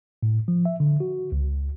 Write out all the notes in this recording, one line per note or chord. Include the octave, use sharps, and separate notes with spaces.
A2
F3
E5
D3
F#4
C#2